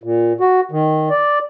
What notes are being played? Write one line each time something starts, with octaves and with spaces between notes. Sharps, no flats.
A#2
F#4
D#3
D5